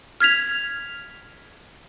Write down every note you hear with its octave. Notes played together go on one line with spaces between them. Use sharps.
F6 G#6 B6 F7